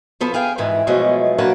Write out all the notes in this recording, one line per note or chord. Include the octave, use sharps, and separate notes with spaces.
F3 B3 A4
G#4 F5 G5 G#5
F2 G#2 E3
B2 F3 F#3 G#3 A3
F#3 A#3 D4 B4 F#5 A5